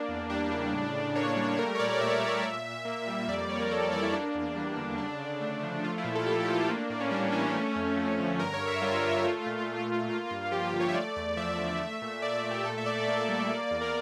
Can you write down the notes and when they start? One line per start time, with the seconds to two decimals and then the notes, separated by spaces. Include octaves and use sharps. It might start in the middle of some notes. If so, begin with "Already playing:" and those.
Already playing: A#3 D4
0.08 E2
0.30 G3 D4
0.51 C#3
0.73 A2
0.95 A2
1.15 A#3 C#5
1.37 G3
1.52 C#5
1.58 A3 A#4
1.75 C#5
1.79 A#2 D5
2.00 A#2 E5
2.22 A3
2.42 A#2
2.64 A#2
2.85 A#3
3.07 G3
3.28 F2 D5
3.38 D5
3.49 F2 C#5
3.60 A#4
3.70 A#3 A4
3.81 A#4
3.91 E3 D5
4.03 E4
4.13 A#3 D4
4.35 E2
4.56 G3
4.77 D3
4.98 C#3 D4
5.20 C#3
5.41 A3
5.62 F3
5.83 A3 F4
5.98 E4
6.04 A#2
6.15 A4
6.26 A#2 G4
6.40 G4
6.47 A3 F4
6.55 G4
6.69 A#3 D4
6.90 A2 D4
7.00 C#4
7.11 G3 D4
7.32 E3 C#4
7.54 A3 C#4
7.75 F2
7.96 F3
8.18 D3
8.39 G2 A#4
8.53 C#5
8.61 G2
8.67 E5
8.82 G3 F4
9.03 D3
9.24 A3
9.46 A#2
9.67 A#2
9.87 A3
10.09 A#3
10.31 G2
10.51 F3 G4
10.66 G4
10.73 D3
10.80 C#5
10.88 E5
10.94 A3 D5
11.16 E2 D5
11.37 F3 E5
11.58 D3
11.79 A3
12.02 A#2
12.22 A#2 D5
12.37 D5
12.43 A3
12.51 G4
12.64 A#2 A4
12.78 E5
12.86 A#2 D5
13.07 A#3 D5
13.28 G3
13.50 A#3
13.71 E2
13.81 A#4